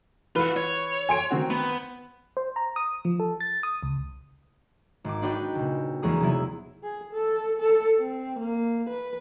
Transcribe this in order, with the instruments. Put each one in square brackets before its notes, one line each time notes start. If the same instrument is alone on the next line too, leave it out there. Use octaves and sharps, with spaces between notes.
[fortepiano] E3 [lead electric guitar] F4 F#5 [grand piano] B4
[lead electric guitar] C#5
[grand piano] G#5 C6 D7
[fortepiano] D#3 C4 F#4
[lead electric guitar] B3
[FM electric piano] C5
A#5
D#6
F3
A4
A6
D#6
C#2
[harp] G#1 D6
D4 D#4 F#4 B4 D5 G5
C#2 A#2
E2 G#3 A#3 C#4 G#4 D#6
C3 F#3 B3 E4
[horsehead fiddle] G#4
A4
A4
C4
A#3
B4